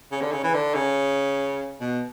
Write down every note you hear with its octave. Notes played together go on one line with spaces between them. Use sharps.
C#3
D3
C#3
E3
D3
C#3
B2